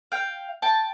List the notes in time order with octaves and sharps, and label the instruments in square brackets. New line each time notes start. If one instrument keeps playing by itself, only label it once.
[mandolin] F5 G5
G5 A5